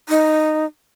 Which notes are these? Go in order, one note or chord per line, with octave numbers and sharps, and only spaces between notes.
D#4